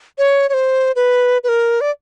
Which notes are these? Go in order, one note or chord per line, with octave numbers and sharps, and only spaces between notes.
C#5
C#5
C5
B4
B4
A#4
D5